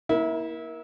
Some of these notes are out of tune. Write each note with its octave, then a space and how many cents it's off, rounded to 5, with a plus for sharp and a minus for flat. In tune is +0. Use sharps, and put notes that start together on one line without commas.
A#3 +25 E4 -25